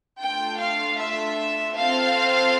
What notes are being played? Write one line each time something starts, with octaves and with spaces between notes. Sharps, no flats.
A3 D4 F4 G5
F5
E5
C4 F4 A4 F5